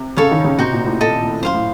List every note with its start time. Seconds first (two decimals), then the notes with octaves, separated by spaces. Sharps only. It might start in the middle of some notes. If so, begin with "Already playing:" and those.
Already playing: C3
0.17 C#3 A4 C#5 F5
0.31 D#3
0.44 C#3
0.59 C3 D#4 F#4 C5
0.72 A#2
0.86 A2
1.01 A4 D#5 A5
1.42 F#2 C5 F5 C6
1.54 A2